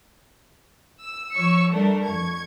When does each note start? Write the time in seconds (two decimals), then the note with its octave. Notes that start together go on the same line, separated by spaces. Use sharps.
1.03 E6
1.34 F3 C#5 C#6 E6 C#7
1.71 G3 A3 D4 A4 A#4
2.06 F2 C#6 G#6